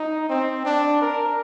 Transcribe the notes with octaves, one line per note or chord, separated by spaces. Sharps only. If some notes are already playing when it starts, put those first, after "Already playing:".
Already playing: D#4
C4
D4
A#4